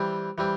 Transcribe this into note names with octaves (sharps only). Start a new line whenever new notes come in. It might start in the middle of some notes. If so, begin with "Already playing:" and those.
Already playing: E3 G3 C4
E3 G3 C4